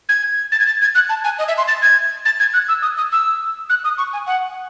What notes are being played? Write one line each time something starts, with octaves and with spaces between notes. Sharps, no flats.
G#6
A6
G#6
A6
G#6
F#6
A5
G#5
D#5
E5
C6
A6
G#6
A6
G#6
F#6
E6
D#6
D#6
E6
F#6
D#6
C#6
G#5
F#5